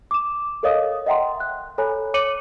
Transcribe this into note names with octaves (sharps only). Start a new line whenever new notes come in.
D6 E7
A4 A#4 C#5 D#5 F5 D#6
D#5 E5 F#5 G5 A#5 C6
F#6
A4 C#5 G#5 A#5 B5 F#6
C#5 D6 C#7 D#7 F#7